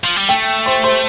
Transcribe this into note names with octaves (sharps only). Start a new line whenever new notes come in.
F3
G3
A3 G5
C5 C6
C5 C6